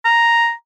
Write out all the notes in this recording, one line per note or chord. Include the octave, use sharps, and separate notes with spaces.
A#5